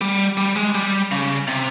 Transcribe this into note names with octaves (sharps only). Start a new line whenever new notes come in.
G3
G3
G#3
G3
C#3
C3